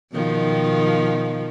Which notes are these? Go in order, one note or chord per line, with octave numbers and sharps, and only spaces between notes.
B2 D#3 F3